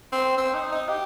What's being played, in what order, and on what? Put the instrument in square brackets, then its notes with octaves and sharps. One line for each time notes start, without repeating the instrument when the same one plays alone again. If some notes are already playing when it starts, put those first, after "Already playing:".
[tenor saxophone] C4
C4
D#4
D#4
G4